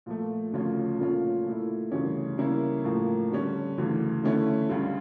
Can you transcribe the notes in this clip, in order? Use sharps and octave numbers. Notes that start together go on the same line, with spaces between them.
A#2 F3 A3
D2 C#3 F3 C#4 F4
A#2 A3 C#4 F4
A#2 A3 E4
D2 C#3 E3 G3 C#4
C#3 G3 A#3 C#4 E4
A2 F3 A#3
D3 G3 C#4
D2 C#3 E3
D3 A3 C#4 E4
C#2 C#3 G3